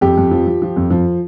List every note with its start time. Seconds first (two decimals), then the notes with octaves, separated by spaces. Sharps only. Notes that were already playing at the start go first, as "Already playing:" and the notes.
0.01 F2 G4
0.17 F2
0.31 F3
0.46 F3
0.62 F3
0.76 F2
0.90 F3